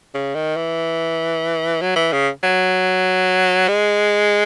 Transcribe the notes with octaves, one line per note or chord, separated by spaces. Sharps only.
C#3
D#3
E3
F#3
E3
C#3
F#3
G#3